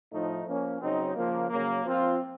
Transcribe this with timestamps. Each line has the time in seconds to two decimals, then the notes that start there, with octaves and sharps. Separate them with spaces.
0.12 A2 F3 A3 D#4
0.46 F3 A#3 C#4
0.81 C#3 F#3 C4 D#4
1.15 C#3 F3 A#3
1.49 C#3 F#3 A#3
1.84 F3 C4 F4